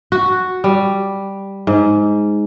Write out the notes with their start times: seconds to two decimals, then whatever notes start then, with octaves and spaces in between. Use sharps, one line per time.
0.12 F#4
0.64 G3
1.67 G#2